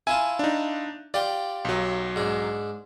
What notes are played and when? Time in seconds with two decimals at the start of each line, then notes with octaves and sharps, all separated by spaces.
0.07 E4 F4 G#5 A5
0.39 D4 D#4
1.14 F4 G4 D5 G5
1.65 B1 F#3
2.16 G#2 D4